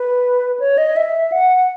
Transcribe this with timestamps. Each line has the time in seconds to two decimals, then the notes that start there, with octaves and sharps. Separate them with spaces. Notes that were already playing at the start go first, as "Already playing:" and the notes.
Already playing: B4
0.60 C#5
0.78 D#5
0.96 E5
1.32 F#5